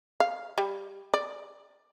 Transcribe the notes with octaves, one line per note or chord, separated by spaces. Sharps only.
F5
G3
D5